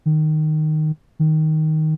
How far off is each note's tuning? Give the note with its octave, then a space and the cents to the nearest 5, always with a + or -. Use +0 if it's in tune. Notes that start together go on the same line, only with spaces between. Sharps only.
D#3 -10
D#3 +5